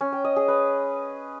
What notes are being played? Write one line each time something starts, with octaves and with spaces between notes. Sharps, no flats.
C#4
G5
D#5
G#4
B4